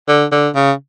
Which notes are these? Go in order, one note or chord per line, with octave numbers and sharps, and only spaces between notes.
D3
D3
C#3